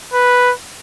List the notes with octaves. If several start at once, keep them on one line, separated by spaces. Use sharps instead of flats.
B4